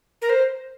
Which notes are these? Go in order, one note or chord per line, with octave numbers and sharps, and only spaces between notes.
A#4
C5